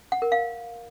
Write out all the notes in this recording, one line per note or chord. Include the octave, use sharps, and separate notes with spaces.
F#5
A#4
F5